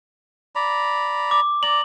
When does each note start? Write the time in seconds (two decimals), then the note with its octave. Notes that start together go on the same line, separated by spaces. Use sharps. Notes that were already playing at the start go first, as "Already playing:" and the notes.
0.55 D5 A#5 B5
1.31 D6
1.63 D5 A#5 F#7